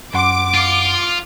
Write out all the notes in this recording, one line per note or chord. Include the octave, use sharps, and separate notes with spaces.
F#2 F#5 C6 D6
F4